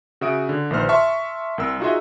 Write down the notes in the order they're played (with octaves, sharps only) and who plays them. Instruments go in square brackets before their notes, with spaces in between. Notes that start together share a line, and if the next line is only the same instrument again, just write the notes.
[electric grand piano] C#3 F#4 E5 D#6 D7
D3
A#1 D#3 B4 C5 F6
E5 A5 C6 C#6 F6
C2 A#4 E6
D#4 F4 F#4 G#4 D#5 E5